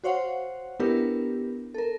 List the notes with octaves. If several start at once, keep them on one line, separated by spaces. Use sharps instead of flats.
F#4 C5 C#5 F5 F#5
B3 D4 E4 G4 A#4 B4
A4 A#4